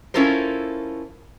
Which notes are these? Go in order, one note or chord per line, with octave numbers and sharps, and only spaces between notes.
C#4 E4 F4 A4 A#4 C5